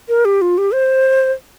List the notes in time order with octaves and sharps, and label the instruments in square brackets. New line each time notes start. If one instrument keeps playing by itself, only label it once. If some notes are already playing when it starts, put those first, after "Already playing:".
[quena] A#4
G4
F4
G4
C5